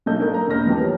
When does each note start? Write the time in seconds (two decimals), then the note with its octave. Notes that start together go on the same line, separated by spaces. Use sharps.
0.06 B1 D4 D#4 A4 D#5 G6
0.20 A#4 G6
0.34 A#5
0.48 E1 A#3 D#5 F6 A#6
0.67 E2 E3 F3 G4 A5
0.82 C#5